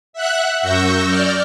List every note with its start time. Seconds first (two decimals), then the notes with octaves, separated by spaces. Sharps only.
0.13 E5 F#5 F#6
0.62 F#2 C#6 E6 G6 A#6
1.07 D5 F6 G6